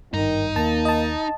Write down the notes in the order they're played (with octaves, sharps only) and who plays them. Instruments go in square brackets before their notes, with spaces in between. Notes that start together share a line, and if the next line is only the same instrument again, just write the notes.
[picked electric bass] G#1 G2 [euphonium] D#3 [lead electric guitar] D#4
[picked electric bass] D#2 [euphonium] A#3 [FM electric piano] A5
[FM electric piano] D#5 A5